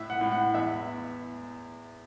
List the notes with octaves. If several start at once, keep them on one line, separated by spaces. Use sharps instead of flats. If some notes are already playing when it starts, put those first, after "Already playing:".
Already playing: A2 E5
F#5
A2
F#5
E2 E5